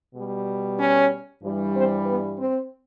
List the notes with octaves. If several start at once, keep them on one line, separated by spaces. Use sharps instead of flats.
B2 G3
C#4 C#5
G2 E3 G3
C4 C5
B3 B4
C4 C5